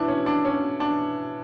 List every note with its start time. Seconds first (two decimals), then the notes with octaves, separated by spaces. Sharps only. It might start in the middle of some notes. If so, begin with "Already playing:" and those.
Already playing: B2 D4 E4
0.08 C#4
0.26 D4
0.45 C#4
0.80 D4